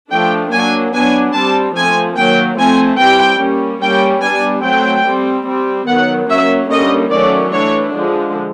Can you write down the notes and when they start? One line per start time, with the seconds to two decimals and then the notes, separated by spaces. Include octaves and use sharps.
0.10 F3 A3 D4 G5
0.51 F#3 A#3 D4 G#5
0.93 F#3 B3 D4 G#5
1.34 G3 C4 A5
1.75 F3 A3 C4 G#5
2.17 D#3 F#3 A#3 G5
2.58 F3 A3 C4 G#5
2.99 E3 G3 C4 G5
3.40 G3 A#3 C#4
3.82 G3 A#3 C#4 G5
4.23 G3 B3 D4 G#5
4.64 F#3 A3 C4 G5
5.05 G3 C4
5.46 G3 C4
5.87 D#3 F#3 B3 F#5
6.29 F#3 A#3 C#4 E5
6.70 D3 G3 A#3 C#4 D#5
7.11 D#3 F#3 A3 C#4 D5
7.53 E3 A3 D4 C#5
7.94 D3 F3 G#3